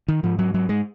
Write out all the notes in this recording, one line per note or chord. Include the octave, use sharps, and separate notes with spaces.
D#3
G#2 F3
F#3
F#3
G#3